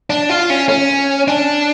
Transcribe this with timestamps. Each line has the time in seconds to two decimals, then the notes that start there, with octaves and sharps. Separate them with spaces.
0.10 D4
0.29 F4
0.50 C#4
0.69 C#4
1.28 D4